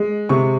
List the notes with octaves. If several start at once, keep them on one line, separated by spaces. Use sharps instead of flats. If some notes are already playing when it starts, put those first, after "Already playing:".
Already playing: G#3
C3 C#6